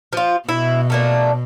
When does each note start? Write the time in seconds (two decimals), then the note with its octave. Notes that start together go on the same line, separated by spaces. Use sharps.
0.13 F3 F4
0.49 B2 E4
0.90 A3 A#3 D4